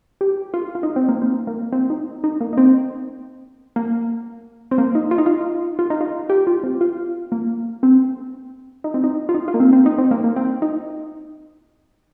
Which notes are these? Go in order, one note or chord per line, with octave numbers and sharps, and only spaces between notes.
G4
F4
F4
D#4
C4
A#3
C4
A#3
C4
D#4
D#4
A#3
D#4
C4
A#3
C4
A#3
D#4
F4
D#4
F4
F4
D#4
F4
G4
F4
C4
F4
A#3
C4
D#4
C4
D#4
F4
D#4
F4
A#3
C4
C4
D#4
C4
A#3
A#3
C4
D#4